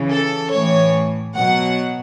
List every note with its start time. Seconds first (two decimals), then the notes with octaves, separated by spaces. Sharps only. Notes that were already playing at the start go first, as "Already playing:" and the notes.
Already playing: C#3 E3
0.11 A4
0.52 A2 E3 C#5
1.35 B2 F#3 F#5